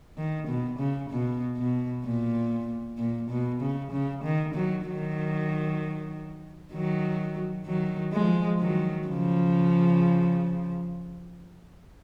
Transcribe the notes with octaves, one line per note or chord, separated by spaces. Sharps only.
D#3
B2
C#3
B2
B2
A#2
A#2
B2
C#3
C#3
D#3
D#3 F#3
D#3 F#3
D#3 F#3
D#3 F#3
F3 G#3
D#3 F#3
C#3 F3